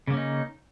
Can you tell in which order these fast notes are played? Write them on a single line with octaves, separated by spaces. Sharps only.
C#3 A#3 C#4 D#4